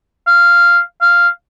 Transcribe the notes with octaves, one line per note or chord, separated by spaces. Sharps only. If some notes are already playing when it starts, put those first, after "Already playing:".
F5
F5